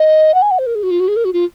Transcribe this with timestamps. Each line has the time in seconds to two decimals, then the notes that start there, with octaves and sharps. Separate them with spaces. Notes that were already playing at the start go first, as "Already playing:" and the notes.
Already playing: D#5
0.34 F#5
0.42 G#5
0.51 F#5
0.59 C5
0.66 A#4
0.75 G#4
0.83 F#4
0.91 F4
1.00 F#4
1.08 G#4
1.16 A#4
1.25 F#4
1.33 F4